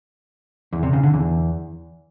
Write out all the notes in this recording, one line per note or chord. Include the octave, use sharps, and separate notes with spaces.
E2
C3
C#3
D3
E2